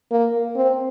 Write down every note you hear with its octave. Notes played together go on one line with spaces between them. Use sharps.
A#3
C4